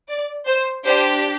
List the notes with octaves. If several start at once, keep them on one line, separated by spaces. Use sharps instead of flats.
D5
C5
D4 G4 C5